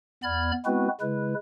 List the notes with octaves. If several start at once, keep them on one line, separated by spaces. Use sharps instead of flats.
E2 B3 D5 B5 F6 G#6
G#3 B3 C4 E4 F#4 B4
C#3 G#3 E4 B4